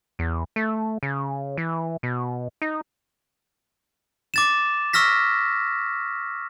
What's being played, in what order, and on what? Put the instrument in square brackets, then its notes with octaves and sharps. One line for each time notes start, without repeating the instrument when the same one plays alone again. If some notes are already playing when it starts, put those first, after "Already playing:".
[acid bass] E2
A3
C#3
E3
B2
D#4
[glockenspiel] D6 A6 E7
C#6 E6 F6 A#6 B6